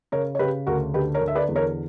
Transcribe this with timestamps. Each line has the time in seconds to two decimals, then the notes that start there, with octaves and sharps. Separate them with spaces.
0.12 C#3 A#4 C#5
0.35 C#5
0.39 C#3 G4 B4
0.67 D2 F#4 A#4
0.94 D3 G4 B4
1.14 A#4 C#5
1.21 D3
1.28 E5
1.35 B4 D5
1.49 E2
1.56 A#4 C#5